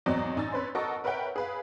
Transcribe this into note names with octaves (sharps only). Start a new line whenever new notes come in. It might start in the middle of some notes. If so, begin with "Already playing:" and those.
G#1 E2 F#3 C4 D5 D#5
A1 D#4 G#5 E6 A6
C#4 B4 C5 C6
F#4 A4 A#4 D#5 C#6
A#4 B4 C#5 E5 F#5 G5
G#4 B4 F5